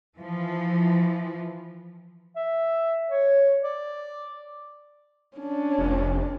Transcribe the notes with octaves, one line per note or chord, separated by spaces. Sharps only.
E3 F3
E5
C#5
D5
C#4 D4
F1